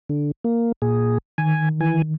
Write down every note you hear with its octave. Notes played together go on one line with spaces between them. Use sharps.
D3
A#3
A#2 G#4
D#3 G#5
E3 G#5